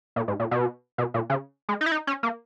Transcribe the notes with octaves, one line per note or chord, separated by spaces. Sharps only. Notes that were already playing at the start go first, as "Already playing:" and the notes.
A#2
G#2
A#2
B2
B2
A#2
C#3
G#3
D#4
E4
D#4
C#4
A#3